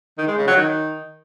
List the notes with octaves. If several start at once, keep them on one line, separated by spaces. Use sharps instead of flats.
D#3
G#3
C#3
F#3
D#3